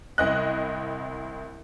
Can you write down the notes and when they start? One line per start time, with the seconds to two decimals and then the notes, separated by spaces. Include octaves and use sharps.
0.18 C2 D#5 F#6